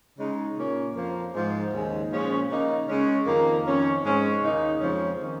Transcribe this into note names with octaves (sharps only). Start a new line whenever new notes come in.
C#3 G#3 D#4
A#2 A#3 C#4
F2 F3 A#3
G#2 F3 G#3
D#2 C#3 G#3
A#2 F3 G#3 C#4
C#3 A#3 D#4
C#3 G#3 C#4
F2 D#3 A#3
F2 D#3 C#4
G#2 G#3 C#4
D#2 C#3 A#3 D#4
F2 F3 G#3 C#4
D#3 A#3 C#4